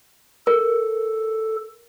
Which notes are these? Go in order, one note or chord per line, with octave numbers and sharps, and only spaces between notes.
A4 A#4